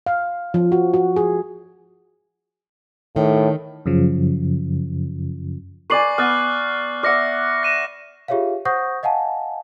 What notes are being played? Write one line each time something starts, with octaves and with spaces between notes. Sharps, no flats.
F5
F3
F#4
F#4
G#4
A2 D#3
F#2 C#3 F3
B4 D5 G#5 C#6 C7 F#7
B3 F6 F#6 A6
D5 E5 F#5 F6 A#6 C#7
A#6 D#7 E7
F4 G4 G#4 C#5 E5 F5
C5 F#5 C#6 D#6 G6 A#6
D#5 F5 F#5 G#5 A5